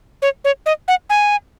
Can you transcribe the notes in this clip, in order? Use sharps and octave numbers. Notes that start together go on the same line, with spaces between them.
C#5
C#5
D#5
F#5
G#5